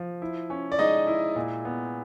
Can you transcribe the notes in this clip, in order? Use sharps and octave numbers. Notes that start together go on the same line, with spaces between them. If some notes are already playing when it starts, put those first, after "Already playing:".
Already playing: F3
E4
C#4
D5
G#3 D#4 D#5
E4
A#2
B3